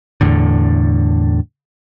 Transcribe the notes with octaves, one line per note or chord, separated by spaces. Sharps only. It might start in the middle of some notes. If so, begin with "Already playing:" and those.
E2 A2 D3